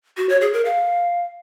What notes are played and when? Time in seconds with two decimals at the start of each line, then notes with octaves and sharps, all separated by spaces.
0.17 F#4
0.29 C#5
0.41 G#4
0.53 A#4
0.65 F5